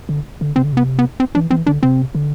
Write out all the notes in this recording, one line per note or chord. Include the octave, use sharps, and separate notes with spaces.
D3
D3
C3 C4
D3
C3 B3
B3
C4
E3 D4
E3 C4
D3 D4
C3 C4
D3